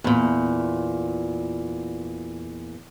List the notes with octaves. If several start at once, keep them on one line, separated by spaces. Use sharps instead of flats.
E2 A#2